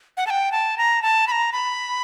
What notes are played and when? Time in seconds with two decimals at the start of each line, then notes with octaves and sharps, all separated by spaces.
0.17 F#5
0.27 A5
0.30 G5
0.52 A5
0.78 A#5
1.02 A5
1.28 B5
1.32 A#5
1.53 B5